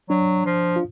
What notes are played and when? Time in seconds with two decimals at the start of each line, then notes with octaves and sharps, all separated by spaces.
0.10 F#3 D4
0.46 F3
0.76 F4